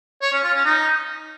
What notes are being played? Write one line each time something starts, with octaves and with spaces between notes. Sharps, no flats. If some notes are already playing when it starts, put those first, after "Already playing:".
C#5
C#4
F4
C#4
D#4